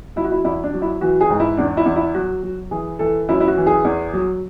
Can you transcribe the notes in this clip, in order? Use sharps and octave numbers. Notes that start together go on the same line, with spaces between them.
F#3 E4
F#4
E4
E2 E4
D4
F#3
E4
E3 F#4
G#4
G#2
E4
E2 D4
E4
E2
E4
F#3 F#4
F#3
E3 G#4
E3 A4
F#2 E4
E4
F#4
E3
G#4
E2
F#3